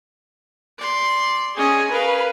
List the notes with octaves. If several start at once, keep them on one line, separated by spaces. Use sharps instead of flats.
D5 C6
C#4 G#4 D#5
A#4 B4 F5